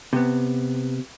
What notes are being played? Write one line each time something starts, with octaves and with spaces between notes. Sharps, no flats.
C3 B3